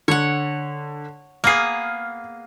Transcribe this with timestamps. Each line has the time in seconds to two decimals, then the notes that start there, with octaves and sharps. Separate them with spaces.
0.08 D3 C#5 F#5
1.44 A#3 B3 G#4 F6 C7